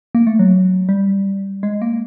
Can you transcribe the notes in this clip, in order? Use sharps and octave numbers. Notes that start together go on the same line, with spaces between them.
A#3
A3
F#3
G3
G#3
A#3